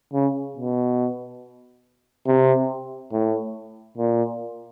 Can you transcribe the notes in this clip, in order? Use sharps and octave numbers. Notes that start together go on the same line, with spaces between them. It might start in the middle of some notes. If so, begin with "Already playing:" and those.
C#3
B2
C3
A2
A#2